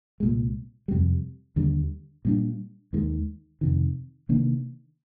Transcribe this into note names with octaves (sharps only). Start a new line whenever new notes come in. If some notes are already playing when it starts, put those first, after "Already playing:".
C2 A#2 G#3
F2 C3 G3
D#2 D3 G3
A#2 G3 D4
D#2 D#3 G#3
F2 C3 D#3
C3 D#3 A#3 D4